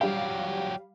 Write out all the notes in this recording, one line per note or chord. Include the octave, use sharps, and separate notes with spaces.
F#3 G3 G4 F5